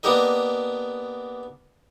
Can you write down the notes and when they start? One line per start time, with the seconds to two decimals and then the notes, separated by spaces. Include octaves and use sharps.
0.03 A#3 B3 D4 G4 A#4 D#5